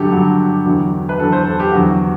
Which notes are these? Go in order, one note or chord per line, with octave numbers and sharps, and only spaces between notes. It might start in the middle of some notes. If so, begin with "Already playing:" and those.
Already playing: G2 D3 F#3 G4 A4
G2 D3 F#3
E2 D3 F#3
B4
E2 D3 F#3 A4
C5
A4
G4
E2 D3 F#3 F#4